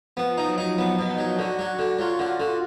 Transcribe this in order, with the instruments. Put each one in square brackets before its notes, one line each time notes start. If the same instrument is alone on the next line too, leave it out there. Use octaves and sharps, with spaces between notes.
[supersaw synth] F3 [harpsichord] B3
[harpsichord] D#4
[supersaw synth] F#3
[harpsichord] D#4
[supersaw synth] F#3 [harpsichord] B3
[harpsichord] B2
[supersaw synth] D#4
[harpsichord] F#3
[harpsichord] D3 [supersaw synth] F#4
[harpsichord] F#3
D3
[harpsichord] F#3 [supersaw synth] F4
[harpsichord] D3
D3